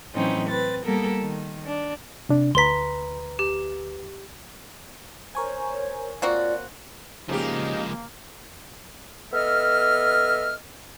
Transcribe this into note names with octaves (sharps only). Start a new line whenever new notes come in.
A2 E3 F#3 C4 C#4 D#4
C4 B4 A6
G3 A#3 B3 A4 A#4
D#3
D4
C3 D4
D2 B4 A#5 C6 B6
G4
A#4 C5 C#5 G#5
A#3 C4 F4 F#4 D5
C#3 F3 G#3 A#3 D#4 G4
B3 A4 D#5 E5 F6